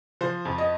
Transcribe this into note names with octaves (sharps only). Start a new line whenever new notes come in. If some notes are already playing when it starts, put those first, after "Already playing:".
F3 C5
F2
D#5